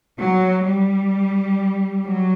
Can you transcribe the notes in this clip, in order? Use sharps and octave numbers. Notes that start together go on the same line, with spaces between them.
F#3
G3
F#3